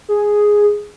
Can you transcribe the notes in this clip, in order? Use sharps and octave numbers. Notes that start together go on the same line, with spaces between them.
G#4